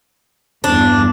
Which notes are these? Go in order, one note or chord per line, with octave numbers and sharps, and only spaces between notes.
E2 G2 D4